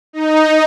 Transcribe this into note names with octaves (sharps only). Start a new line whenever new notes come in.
D#4